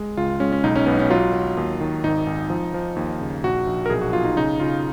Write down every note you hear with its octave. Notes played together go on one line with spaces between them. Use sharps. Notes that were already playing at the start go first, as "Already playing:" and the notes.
Already playing: G#3
C#2 F4
G#3 C#4
C#4
B1 D#4
C#4
B1 B3
C#4
F#3 F4
F#3
D#2
D#3
G#1 D#4
G#1
F3
F3
D#2
C#3
A#1 F#4
A#1
A#4
B1 G#4
F#4
B1 F4
D#4
C#3 D#4
C#3 F4